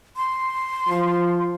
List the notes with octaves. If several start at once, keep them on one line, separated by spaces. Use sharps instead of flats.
C6
F3